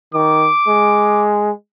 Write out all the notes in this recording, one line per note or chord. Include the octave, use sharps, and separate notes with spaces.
D#3 D6
G#3